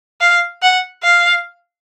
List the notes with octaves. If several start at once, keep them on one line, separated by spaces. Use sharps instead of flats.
F5
F#5
F5